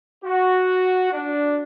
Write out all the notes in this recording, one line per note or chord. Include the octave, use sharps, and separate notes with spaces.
F#4
D4